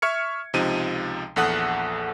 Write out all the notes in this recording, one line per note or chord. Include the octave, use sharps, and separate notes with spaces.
E5 C#6 F6 G#6 C#7
C#2 C3 F3 D#4 D#7
A#1 E2 A4 F#5 D#6 F#6